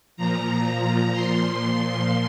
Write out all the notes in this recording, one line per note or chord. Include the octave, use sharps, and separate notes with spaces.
A#2 F3 A#5
A#2 F3 C6